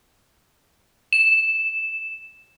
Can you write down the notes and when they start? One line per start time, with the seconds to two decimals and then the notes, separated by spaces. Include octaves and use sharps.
1.13 E7